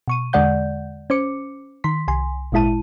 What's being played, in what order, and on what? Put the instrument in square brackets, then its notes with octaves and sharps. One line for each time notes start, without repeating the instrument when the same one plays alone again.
[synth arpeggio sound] B2 C#6 D#7
E2 D3 G#3 D5 F#5 G6
C#4 C5 D6 C#7
D#3 C6 B6
C2 G#5 C6
G#1 A#2 G#3 E4 A5 D#7